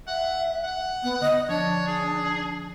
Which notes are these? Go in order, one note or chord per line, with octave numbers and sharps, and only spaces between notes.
E5 F#5
F#5
B3
D3 D#5
F3 D4 C#5
G#4